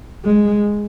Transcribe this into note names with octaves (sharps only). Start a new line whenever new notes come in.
G#3